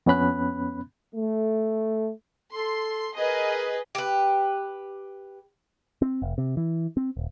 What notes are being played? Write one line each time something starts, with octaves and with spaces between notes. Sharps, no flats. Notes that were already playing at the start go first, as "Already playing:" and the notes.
F2 B3 C#4 B5 F#6
A3
A4 C6
G#4 A#4 B4 D#5
G4 B4
C4
F1
C3
E3
C4
D#1